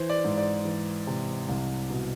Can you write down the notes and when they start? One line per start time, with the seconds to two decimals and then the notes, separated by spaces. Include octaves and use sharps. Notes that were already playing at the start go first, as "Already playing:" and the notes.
Already playing: E3 C5
0.10 D5
0.24 G#2
0.38 D5
0.65 E3
1.07 C3
1.49 C2
1.90 B2